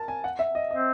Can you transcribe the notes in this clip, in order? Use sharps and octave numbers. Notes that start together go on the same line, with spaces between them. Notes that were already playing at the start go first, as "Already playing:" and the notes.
Already playing: A#4 A5
G#5
F#5
E5
D#5
C4 D#5